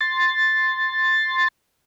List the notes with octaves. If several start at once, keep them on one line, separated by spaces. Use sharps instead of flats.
C6 A6